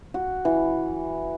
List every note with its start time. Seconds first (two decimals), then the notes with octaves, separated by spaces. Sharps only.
0.14 F#4
0.45 E3